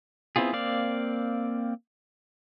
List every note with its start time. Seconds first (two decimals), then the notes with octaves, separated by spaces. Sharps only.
0.36 B3 C4 E4 F4 G#4
0.53 A#3 C4 D5 F5